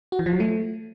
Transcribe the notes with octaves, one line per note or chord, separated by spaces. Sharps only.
F#4
E3
F3
F#3
A3